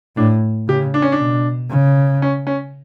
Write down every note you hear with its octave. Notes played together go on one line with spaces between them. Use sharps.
A2 D4
C#3 G4
D4
C#4
D4
B2
C#3
C#4
C#4